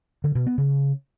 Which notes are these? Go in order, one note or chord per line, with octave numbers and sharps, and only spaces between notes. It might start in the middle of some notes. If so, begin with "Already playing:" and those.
D3
B2
B3
C#3